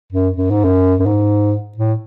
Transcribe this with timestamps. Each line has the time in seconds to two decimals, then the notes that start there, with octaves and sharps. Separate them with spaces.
0.12 F#2
0.36 F#2
0.50 G#2
0.64 F#2
1.00 F#2
1.06 G#2
1.77 A2